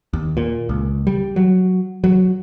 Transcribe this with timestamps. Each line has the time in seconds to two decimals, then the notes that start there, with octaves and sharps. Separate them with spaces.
0.13 D#2
0.37 A#2
0.69 C#2
1.07 G3
1.36 F#3
2.04 F#3